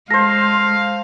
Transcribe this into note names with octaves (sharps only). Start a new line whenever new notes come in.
G#3 A4 C5 F5 A#6